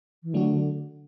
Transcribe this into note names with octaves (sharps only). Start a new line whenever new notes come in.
E3
D3 F#3 A3 D4 F#4
D3